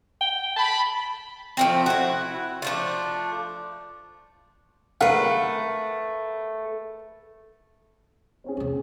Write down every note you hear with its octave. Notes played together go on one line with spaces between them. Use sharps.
G5
A5 B5
F3 A3 C4
E4 F#4
F3 A3 D4
A3 A#4 B4 F5 F#5
C4 C#4 G#4
E2 C3